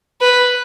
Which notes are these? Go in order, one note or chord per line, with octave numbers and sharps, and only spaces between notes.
B4